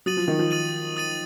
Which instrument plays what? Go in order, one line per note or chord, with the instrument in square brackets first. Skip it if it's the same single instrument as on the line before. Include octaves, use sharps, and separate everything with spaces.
[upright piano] F#3 [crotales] D#6 A6 D#7 F#7
[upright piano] F3
D#3
F3
[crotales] D#6 A6 D#7 F#7
D#6 A6 D#7 F#7